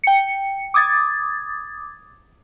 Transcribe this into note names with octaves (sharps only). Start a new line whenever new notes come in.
G5 C#7
D6 D#6 G#6 A6